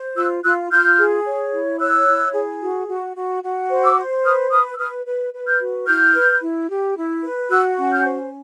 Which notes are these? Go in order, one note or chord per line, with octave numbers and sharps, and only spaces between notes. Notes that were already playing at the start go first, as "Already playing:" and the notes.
Already playing: C5
F4 E6 F#6
F4 E6 F#6
F4 F6 G6
G#4
C#5
E4
C#5 E6 F#6
E4
G#4
F#4
F#4
F#4
F#4
C5
D6 E6
C5
B4 D#6 F6
B4 D#6 F6
E6
B4 D#6 F6
B4
B4
F6 G6
F#4
E4 F6 G6
B4
E4
G4
E4
B4
F#4 E6 F#6
C#4
F6 G6
C5